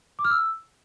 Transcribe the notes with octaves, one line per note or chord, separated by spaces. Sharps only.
D6
F6
E6